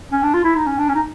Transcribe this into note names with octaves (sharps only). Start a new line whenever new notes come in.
C#4
D4
F4
E4
D#4
C#4
D4
C#4
D#4